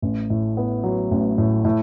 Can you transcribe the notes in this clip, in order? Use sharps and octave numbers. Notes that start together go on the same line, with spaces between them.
A1
A2
B3
F#3
A1
A2
A2